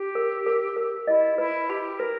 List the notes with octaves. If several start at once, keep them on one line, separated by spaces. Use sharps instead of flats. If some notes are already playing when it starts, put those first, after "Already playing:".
Already playing: G4
A#4
A#4
A#4
E4 D#5
E4 B4
G4 B5
A#4 B4